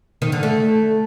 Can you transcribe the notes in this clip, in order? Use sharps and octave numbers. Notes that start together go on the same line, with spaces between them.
D#3
D3
A3